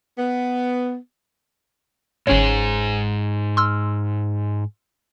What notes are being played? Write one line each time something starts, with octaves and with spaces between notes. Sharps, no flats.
B3
G1 G#2 G#3 C#4 G#4 C#5
C6 E6 F6